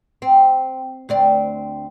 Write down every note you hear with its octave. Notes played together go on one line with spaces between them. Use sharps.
C4
D2 C4 D5